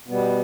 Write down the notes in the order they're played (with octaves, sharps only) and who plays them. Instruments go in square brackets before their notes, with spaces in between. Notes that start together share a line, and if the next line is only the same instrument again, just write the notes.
[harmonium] B2 G3 B3